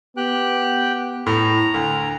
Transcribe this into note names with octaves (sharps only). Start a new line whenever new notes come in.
B3 G4 G5 F#6
A2 A#5
D2